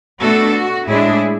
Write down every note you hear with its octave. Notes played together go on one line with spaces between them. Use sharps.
B2 A3 D4 F#4 A4
F#4
A2 G#3 D4 E4 G#4